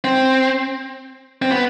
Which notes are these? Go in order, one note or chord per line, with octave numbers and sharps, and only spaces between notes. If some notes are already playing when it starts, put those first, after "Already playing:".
C4
C4
B3